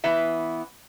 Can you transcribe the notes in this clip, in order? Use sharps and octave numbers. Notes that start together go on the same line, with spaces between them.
E3 B3 E5